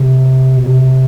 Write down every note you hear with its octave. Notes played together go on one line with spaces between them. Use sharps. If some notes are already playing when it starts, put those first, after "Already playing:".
Already playing: C3
B2
C3